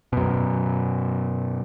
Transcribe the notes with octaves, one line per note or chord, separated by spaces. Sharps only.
F#2 B2